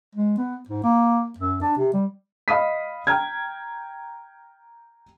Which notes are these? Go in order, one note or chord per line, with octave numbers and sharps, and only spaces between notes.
G#3
B3
G#2
A#3
F#2
D4
C3
G3
D#5 F5 B5 D#6 B6
G5 A#5 F6 G#6